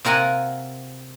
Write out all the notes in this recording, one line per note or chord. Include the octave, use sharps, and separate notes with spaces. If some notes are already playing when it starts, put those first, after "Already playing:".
C3 F4 A#4 F#5 G#5